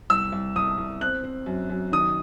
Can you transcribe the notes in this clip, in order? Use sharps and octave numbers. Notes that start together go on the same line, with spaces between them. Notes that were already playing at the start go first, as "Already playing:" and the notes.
C2 E6
C2
C2 D#6
C2
C4 F#6
C4
F#2
F#2
D#3 D#6